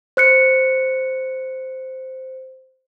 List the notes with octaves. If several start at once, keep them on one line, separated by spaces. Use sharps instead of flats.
C5 F#6 C#7